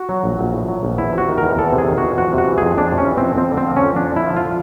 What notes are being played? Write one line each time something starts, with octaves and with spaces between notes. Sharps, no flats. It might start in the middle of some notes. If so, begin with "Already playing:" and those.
Already playing: F#4
F#3
A#1
A#1
A2
F#3
A#1
E2 E4
C3 F#4
D#3
A#4
E2
E2 A4
C3
G#4
D#3
F#4
E2
F2 F#4
C3 F#4
E3
F2 G#4
F2 D4
C3
C#4
E3
F2 C4
F2 C4
D3
C4
F3
F2 C#4
F2 D4
D3 E4
F3
F4